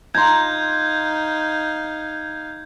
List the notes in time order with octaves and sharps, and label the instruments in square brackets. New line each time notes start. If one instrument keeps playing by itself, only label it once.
[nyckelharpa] D#4 F5 [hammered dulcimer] A#5 C6 [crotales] G6 G#6